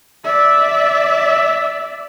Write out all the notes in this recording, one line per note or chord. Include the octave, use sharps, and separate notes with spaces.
D5 E5